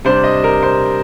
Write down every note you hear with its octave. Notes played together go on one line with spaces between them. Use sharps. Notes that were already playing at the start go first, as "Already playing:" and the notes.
C3 G3 D4 C5
D#5
A#4
C5